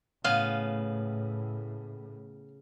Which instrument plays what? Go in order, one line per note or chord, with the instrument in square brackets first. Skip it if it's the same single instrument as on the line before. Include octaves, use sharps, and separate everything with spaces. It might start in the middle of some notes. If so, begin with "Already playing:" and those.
[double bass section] A2 [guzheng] C#3 B3 [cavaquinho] F5